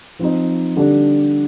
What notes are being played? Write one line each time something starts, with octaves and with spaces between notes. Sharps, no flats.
F3 C4 D#4
D3 G3 D4